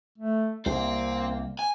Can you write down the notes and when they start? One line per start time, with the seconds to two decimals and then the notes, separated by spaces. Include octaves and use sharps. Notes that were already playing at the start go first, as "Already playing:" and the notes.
0.18 A3
0.66 C2 A#3 C4 C5
1.59 G#5